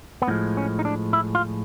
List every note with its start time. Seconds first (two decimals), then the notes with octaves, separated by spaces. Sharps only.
0.22 B3
0.28 A2 F3 G#3 C4
0.57 C#4
0.79 D#4
0.85 D4
1.13 E4
1.35 F4